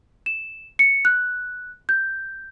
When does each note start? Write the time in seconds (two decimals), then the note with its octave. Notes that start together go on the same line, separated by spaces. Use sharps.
0.26 E7
0.79 C#7
1.05 F#6
1.89 G6